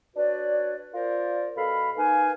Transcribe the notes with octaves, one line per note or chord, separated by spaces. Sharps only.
D4 F#4 B4 C#5 D5
F4 A#4 C5 D5
B2 A4 F5 B5
A#3 D#4 B4 F5 G#5